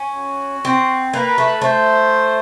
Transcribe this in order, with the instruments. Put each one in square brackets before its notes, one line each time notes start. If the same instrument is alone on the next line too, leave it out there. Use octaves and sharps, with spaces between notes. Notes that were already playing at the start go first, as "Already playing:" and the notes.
Already playing: [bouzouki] C#4
[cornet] F#4
[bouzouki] C4
[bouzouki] A#3 [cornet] B4
[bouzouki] A3
[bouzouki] A3 [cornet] C5